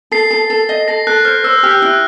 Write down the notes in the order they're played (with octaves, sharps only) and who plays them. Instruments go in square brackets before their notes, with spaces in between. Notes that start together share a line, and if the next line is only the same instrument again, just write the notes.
[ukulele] A4 [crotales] C7
[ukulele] A4
A4
D#5
[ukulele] A4 [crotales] A#6
[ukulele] A4 [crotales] F#6
[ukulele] C5 [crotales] F6
[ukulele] C5 [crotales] E6
[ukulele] G4 [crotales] F6
[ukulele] E4 [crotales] F#6